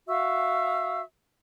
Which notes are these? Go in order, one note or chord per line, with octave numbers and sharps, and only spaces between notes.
F#4 E5 F5 E6